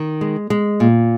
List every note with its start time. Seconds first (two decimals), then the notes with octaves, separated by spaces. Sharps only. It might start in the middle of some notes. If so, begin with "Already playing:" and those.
Already playing: D#3
0.21 G#3
0.50 G#3
0.80 A#2